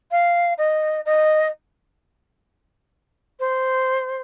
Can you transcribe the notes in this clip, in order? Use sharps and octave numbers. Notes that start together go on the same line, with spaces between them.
F5
D#5
D#5
C5